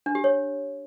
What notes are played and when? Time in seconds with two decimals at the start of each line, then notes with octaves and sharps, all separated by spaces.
0.06 D4
0.15 G4
0.24 C#5